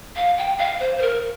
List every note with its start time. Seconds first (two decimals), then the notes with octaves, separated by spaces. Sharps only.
0.16 F5
0.38 G5
0.58 F5
0.80 C5
0.98 C5
1.02 A#4